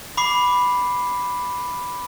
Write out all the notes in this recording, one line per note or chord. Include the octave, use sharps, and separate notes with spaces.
B5 D6 C7